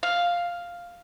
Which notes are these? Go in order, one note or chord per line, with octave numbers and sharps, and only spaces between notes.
F5